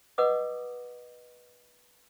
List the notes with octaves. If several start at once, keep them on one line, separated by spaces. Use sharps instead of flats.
B4 D#5 F#5 D6 D#6